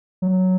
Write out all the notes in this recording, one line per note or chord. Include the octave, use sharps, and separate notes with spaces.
F#3